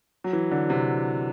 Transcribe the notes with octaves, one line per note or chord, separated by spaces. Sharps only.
F#3
E3
D3
C3